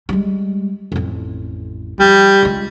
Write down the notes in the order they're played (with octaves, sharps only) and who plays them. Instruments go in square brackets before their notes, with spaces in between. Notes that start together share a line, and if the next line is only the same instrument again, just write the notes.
[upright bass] G3 G#3
A1 F2
[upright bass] F3 [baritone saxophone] G3
[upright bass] C#2 G#3